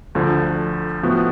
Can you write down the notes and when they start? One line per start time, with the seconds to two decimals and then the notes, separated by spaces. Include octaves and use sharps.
0.15 D2 D3 F3
1.03 A2 F3 B3 F#4